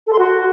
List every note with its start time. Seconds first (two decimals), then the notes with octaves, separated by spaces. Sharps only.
0.07 A4
0.13 C6
0.19 F#4